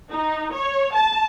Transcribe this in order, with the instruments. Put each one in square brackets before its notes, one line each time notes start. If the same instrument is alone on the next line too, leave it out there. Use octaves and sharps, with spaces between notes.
[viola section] D#4
C#5
A5